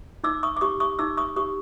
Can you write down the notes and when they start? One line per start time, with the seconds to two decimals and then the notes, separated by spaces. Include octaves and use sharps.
0.24 D#4 D6 E6
0.43 C#6 D#6
0.57 D6
0.61 G4 C#6 D#6
0.80 C#6 D#6
0.99 D#4 D6 E6
1.17 C#6 D#6
1.36 G4 C#6 D#6